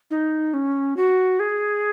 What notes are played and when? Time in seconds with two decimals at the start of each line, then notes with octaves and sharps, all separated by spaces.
0.11 D#4
0.54 C#4
0.97 F#4
1.40 G#4